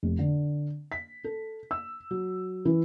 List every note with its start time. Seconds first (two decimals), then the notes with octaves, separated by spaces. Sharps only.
0.03 F1
0.19 D3
0.92 B6
1.24 A4
1.71 E6
2.11 F#3
2.65 E3